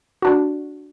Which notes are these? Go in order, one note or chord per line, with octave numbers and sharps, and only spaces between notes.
D4 F#4